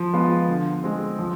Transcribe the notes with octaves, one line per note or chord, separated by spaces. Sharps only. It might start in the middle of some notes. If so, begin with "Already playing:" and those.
Already playing: F3
G#3 B3 F4
D3
G#3 C4
F3